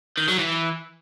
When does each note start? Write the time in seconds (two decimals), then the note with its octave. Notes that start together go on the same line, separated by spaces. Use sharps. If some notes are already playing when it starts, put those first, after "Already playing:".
0.18 D#3
0.28 F#3
0.39 E3